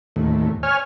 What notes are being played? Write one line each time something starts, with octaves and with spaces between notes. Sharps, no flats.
D#2 A2
C#5 G#5 F6